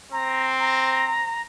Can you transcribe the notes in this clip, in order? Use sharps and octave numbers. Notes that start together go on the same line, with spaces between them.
C4 A#5
A#5